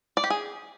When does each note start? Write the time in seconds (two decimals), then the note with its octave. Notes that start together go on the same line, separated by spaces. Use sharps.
0.17 D5
0.24 G4
0.30 G#4